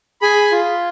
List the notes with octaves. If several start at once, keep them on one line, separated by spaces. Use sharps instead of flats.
G#4 G#5 B5
F4